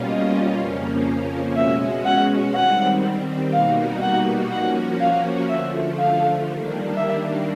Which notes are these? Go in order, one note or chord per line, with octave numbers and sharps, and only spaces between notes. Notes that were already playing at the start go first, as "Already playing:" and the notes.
Already playing: B2 G3 A#3 C#4 F4
D#5
F2 C#3 F3 A#3 C#4
B2 G#3 C#4 F#4 E5
F#5
D#3 G3 C4 F#5
B2 G3 A#3 D#4 F#4 F5
F#5
F3 A#3 C#4 F#4 F#5
F5
D3 F3 A3 E5
F5
D#3 G3 A#3 D4
E5